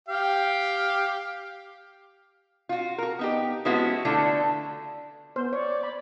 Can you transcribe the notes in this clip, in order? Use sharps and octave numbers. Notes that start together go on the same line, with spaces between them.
G4 F5 G5
F4 F#4
F#4 A#4
B3 D#4 G4
F3 G#3 B3 C#4 E4 F#4
D3 A3 E4 F4
B3 C5
C#5 D5
B5